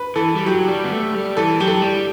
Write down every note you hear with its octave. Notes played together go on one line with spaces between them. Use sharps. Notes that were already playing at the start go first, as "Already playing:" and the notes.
Already playing: B4
E3 A4
G3
F#3 G4
G3
B3
A3
G3
E3 A4
F#3 G4
A4
G3